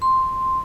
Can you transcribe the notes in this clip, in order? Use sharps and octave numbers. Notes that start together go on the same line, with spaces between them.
C6